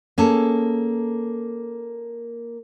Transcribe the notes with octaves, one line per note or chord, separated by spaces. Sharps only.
A#3 C#4 G#4 A4